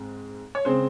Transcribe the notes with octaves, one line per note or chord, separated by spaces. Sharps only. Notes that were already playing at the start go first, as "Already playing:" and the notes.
Already playing: G#2 G#3 C4
C#5
C#3 G#3 C4 C5